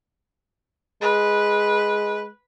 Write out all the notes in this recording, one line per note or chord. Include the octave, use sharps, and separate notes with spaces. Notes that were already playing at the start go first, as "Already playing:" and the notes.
G#3 B4